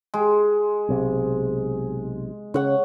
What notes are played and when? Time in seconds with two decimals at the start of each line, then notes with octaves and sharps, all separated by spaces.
0.14 G#3
0.89 B1 C3
2.54 C#3 C#5 F#5